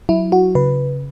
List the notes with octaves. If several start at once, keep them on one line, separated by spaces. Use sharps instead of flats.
F#3 E4
F#4
C#3 B4